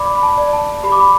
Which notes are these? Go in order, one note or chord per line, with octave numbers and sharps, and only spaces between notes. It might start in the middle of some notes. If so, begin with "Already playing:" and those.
Already playing: D5 B5 D6
B5
A5
D5
A5
G4 B5
D6
B5